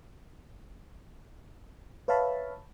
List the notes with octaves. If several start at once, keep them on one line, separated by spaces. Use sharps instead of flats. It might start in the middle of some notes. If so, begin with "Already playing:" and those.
B4 C#5 E5 F5 A5 B5